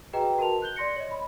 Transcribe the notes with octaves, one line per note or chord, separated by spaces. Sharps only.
F#4 G#4 B4 D#5 G5 A#5
F#4 A#4 A5 F7
F#6 G6 G7
D5 C6 A#6 C#7
C#5 D#5
B5